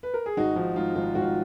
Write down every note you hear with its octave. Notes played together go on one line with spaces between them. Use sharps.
B4
A#4
G#4
G#1 D#4 F#4
F3 D#4
G#2 F4
G#1 F4
G#1 F#4
F4